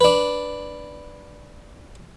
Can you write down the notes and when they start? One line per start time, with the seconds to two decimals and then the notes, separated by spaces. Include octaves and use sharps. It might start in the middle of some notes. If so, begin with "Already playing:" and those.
0.01 D4 B4